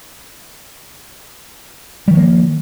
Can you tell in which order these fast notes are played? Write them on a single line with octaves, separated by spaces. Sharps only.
G3 D#3 F3 A#3